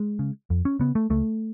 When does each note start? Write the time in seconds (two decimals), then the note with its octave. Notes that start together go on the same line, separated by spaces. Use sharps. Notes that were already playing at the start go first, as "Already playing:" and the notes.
Already playing: G#3
0.19 C#3
0.50 F2
0.65 C#4
0.79 C#3 B3
0.95 A3
1.10 C#2 A3